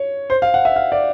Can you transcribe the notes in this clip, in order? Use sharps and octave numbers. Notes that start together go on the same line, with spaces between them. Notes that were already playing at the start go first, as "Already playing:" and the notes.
Already playing: C#5
C5
F5
F#5
E5
F5
D5